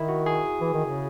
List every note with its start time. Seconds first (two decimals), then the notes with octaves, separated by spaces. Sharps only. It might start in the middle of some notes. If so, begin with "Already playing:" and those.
Already playing: D#3 E4
0.09 F#4
0.26 G#4
0.61 E3
0.73 D#3
0.85 C#3